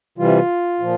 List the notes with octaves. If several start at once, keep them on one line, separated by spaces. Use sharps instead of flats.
C3 E3 G3 F4
A#2 F3